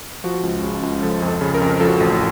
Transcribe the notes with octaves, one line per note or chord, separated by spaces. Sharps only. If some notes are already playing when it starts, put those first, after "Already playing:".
F3 F#4
C#2
C#3
C#2
F3 A4
F2
A4
C#3
A#4
F2
F3 A4
F#4
A1 A4